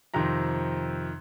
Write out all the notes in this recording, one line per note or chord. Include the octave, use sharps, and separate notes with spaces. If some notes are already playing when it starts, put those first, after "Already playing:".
F2 C3 D#3 A#5